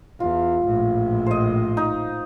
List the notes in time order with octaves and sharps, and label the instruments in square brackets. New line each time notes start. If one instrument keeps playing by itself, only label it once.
[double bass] E2 [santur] F4
[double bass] A#1 A2
[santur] C5 D#5
D#4